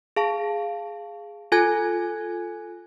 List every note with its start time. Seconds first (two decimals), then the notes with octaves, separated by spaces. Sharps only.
0.16 G#4 F5 A5
1.52 F4 A4 G#5 F#6 G#6